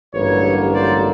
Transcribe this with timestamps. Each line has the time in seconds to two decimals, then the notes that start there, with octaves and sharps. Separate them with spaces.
0.14 A1 G2 D3 F#3 A#3 B4 C#5
0.75 C5 D5